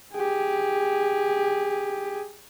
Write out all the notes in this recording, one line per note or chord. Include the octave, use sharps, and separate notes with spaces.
G4 G#4